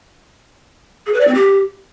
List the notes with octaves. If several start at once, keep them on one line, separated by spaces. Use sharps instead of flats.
G#4
B4
D5
C4
G4